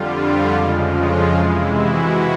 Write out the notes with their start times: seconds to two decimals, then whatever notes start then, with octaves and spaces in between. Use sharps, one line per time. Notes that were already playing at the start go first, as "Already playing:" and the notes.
Already playing: F2 D3 G3 F4
0.11 F4
0.52 F2 C#3 F3 G#3
0.92 F4
1.33 C3 E3 G#3 E4
1.74 F#4